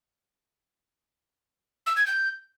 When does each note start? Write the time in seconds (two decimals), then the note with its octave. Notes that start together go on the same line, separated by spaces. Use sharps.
1.86 E6
1.96 G#6
2.06 G6